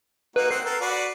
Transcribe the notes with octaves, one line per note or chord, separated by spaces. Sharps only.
A#3 D#4 F#4 B4
C4 F#5 C7
A4 A#4
F#4 B4 D5